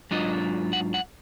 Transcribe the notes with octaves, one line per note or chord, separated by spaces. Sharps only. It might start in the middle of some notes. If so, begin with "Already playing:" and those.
G#2 F#3 D4 F4 D#5
F#5
F#5